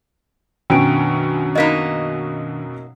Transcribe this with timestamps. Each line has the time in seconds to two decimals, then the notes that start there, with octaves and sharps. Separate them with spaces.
0.70 F#2 B2 D#3 C#4 D4 G5 D7
1.55 F#3 A#3 D#4 D#5 B6